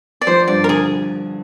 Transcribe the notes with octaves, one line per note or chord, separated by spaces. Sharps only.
D5
F3 C5
G2 D5
A#4
D3 G#4